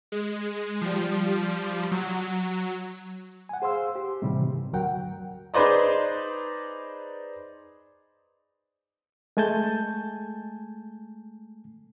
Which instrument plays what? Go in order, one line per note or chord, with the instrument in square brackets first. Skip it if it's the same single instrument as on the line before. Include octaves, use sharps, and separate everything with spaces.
[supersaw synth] G#3
F3 G3
F#3
[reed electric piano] F#5 G#5
G#4 C5 F5 C6 E6
G4
A2 C3 D#3 E3 G3
G2
D2 F#3 A#4 F#5 G5
[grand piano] D#4 G#4 B4 C5 D5 D#5
[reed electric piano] G#3 A3 G#5 A5 G6